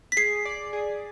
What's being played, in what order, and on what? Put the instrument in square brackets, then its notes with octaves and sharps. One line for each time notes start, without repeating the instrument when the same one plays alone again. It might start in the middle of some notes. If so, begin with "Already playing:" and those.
[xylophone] B6
[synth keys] G#4 [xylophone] C7
[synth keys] D5
G#4